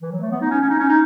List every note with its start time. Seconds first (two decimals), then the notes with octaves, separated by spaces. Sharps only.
0.02 E3
0.12 F#3
0.21 A3
0.31 B3
0.41 D#4
0.50 C#4
0.61 C#4
0.70 D#4
0.79 C#4
0.89 D#4